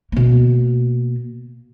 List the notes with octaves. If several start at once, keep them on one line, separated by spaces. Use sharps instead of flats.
B2 A#3